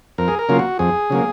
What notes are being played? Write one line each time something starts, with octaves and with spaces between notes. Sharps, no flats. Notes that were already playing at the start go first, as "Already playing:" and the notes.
F2 A#4
G#4
A#4
C#3 F#3 A#3 F4
F#4
F2 G#4
C#3 F#3 A#3